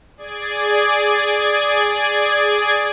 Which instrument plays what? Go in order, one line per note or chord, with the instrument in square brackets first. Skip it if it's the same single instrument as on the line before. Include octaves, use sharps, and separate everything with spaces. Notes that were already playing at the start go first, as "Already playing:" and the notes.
[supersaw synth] G#4 D5 G#6